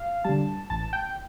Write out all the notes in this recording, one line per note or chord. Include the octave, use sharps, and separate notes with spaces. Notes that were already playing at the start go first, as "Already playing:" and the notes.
Already playing: F5
D3 G3 A5
A1 A5
G5